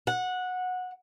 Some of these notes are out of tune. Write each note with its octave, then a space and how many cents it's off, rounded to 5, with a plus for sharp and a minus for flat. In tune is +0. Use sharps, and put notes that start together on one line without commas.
F#5 -15